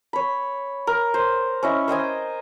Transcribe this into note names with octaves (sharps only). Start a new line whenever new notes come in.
C#5 B5
A#4
C5
C#4 E4 D#5
C5 D#5 G5 G#5